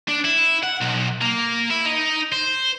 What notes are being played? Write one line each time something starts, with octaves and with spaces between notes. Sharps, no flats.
D4
E4
F#5
B1
A#3
E4
D#4
C5